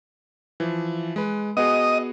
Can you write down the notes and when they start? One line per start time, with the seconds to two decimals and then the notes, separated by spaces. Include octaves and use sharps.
0.60 E3 F3
1.16 G#3 B4
1.57 B3 F#4 G#4 D#5